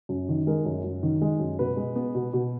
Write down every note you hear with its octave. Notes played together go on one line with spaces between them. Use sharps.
F#2
D#3
G#3 A#4
F#2
F#2
D#3
G#3
F#2
B2 B4
G#3
B3
B2
B2